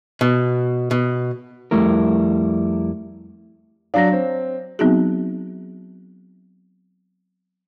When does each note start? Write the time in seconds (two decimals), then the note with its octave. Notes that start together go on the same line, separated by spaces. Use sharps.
0.21 B2
0.91 B2
1.71 F2 G3 A3 E4 A#4
3.94 F#3 D4 F5 A#6
4.12 C4 C#5
4.79 F#3 B3 C4 D#4 F#4 G#4